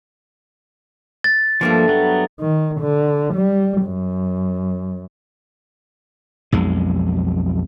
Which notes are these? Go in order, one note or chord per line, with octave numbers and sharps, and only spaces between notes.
A6
G2 F3 G3 A3 A#3
F#3 B3
D#3
D3
G3
F#2
B1 F2 G#3